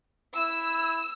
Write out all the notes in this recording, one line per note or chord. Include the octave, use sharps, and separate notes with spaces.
E4 E6